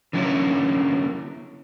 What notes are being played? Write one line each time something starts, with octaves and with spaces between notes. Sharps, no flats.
D3 F#3 A#3 B3 C#4 E4